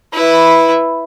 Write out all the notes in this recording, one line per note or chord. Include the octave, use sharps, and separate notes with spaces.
E4 B4